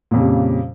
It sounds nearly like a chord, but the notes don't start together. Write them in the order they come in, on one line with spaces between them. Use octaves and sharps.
A#2 F2 C#3 G3